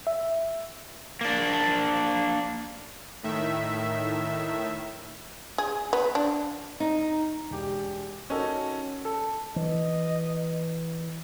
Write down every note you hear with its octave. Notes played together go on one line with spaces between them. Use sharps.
E5
A#3 D4
A2 D#3 E5
G#4
B3
D4
D#4
E1 G4
C#4 D#4 F#4 A4 A#4 C#5
A4
E3 D#5